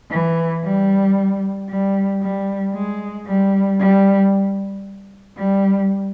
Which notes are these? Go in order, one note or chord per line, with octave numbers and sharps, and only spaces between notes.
E3
G3
G3
G3
G#3
G3
G3
G3